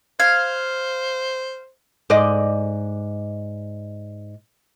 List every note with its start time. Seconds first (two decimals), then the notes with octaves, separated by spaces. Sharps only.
0.20 C5 F5 G#6
2.10 G#2 D5 D#5